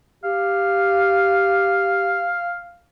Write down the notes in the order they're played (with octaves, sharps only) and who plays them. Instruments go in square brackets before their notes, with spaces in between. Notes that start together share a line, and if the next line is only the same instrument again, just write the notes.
[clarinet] G4 [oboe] F5